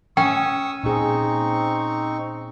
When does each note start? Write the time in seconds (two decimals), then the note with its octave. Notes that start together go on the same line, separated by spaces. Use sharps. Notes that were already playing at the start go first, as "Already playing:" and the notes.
0.17 C#4 G5 C#6 D#6 E6
0.83 A#2 C4 D#4 G#4 C#6